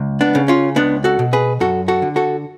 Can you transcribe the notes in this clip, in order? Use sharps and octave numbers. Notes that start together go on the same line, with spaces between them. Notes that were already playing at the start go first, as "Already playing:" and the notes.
Already playing: C#2
B3 D4
C#3
C#4 F4
C#2 B3 D4
F#4 A4
B2
G#4 B4
F#2 F#4 A4
F#4 A4
D3
F#4 A4